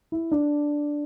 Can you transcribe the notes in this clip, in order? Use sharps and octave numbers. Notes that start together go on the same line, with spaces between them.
E4
D4